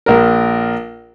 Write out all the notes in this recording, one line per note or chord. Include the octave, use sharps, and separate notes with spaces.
A#1 A#4